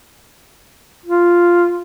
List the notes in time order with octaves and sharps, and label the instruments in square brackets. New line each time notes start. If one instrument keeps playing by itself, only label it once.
[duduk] F4